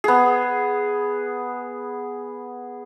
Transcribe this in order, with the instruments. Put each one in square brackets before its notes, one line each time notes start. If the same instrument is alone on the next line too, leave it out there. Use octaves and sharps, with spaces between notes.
[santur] B3 G#4